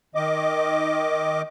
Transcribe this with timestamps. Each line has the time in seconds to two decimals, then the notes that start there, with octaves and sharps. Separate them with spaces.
0.15 D#3 D#5 D6